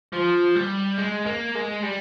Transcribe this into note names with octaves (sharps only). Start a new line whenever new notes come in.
F3
G3
G#3
A#3
G#3
G3